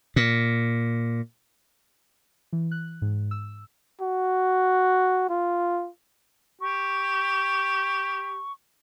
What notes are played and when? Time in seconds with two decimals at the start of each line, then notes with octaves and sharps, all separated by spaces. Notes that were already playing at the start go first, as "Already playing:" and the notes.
0.16 A#2
2.53 E3
2.71 F#6
3.02 G#2
3.31 E6
4.02 F#4
5.29 F4
6.61 G4 C#6